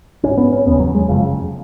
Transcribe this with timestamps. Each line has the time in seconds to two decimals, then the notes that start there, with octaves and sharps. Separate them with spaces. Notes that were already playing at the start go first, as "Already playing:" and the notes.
0.23 G#1 C#4
0.28 G#2
0.37 B3
0.52 C#4
0.66 F1 D#2 C#3 B3
0.80 F#3
0.95 G#3
1.08 F#1 F2 C#3